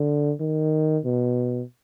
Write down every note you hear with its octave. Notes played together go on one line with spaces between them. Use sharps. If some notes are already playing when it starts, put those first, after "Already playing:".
Already playing: D3
D#3
B2